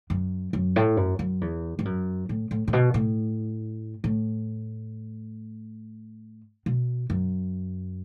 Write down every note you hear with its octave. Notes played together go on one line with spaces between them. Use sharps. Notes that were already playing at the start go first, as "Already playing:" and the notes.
F#2
F#2
A2
F#2
F#2
E2
G2
F#2
A2
A2
A2
B2
A2
A2
B2
F#2